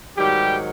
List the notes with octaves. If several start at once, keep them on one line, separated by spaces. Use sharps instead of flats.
G#2 D#3 F#3 G3 G4